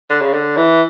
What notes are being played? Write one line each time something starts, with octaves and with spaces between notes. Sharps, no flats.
D3
C#3
D3
E3